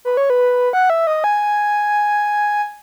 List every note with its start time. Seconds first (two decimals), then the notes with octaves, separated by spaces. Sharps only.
0.05 B4
0.17 C#5
0.30 B4
0.73 F#5
0.90 E5
1.07 D#5
1.24 G#5